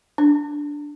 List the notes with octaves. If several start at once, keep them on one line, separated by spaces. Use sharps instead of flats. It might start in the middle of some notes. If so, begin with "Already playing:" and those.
D4